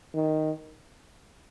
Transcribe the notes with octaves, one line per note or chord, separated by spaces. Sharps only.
D#3